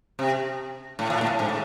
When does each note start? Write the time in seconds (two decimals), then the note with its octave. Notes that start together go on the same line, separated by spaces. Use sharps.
0.19 C3
0.99 A2
1.10 A#2
1.21 A2
1.39 G#2
1.49 A2